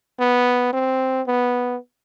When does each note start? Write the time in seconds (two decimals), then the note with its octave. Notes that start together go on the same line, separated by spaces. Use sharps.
0.19 B3
0.73 C4
1.27 B3